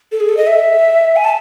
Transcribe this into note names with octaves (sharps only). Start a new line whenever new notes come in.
A4
G#4
A4
D#5
E5
G#5
A5